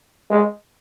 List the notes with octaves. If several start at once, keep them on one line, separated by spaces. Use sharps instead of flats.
G#3